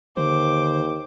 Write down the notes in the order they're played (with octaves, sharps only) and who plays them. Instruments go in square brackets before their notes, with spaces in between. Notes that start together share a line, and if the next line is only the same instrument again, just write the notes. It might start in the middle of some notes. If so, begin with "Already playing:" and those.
[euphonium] D#2 [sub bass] D3 [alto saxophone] C5 [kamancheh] D6